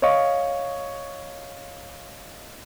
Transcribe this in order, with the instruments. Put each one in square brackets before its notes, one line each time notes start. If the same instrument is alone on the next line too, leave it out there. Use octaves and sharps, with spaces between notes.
[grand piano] C#5 D#5 F5 C#6